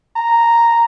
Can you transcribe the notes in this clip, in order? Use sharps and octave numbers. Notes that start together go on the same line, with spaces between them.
A#5